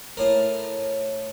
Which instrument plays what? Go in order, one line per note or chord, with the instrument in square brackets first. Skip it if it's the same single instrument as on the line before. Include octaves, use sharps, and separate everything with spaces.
[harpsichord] A2 A#4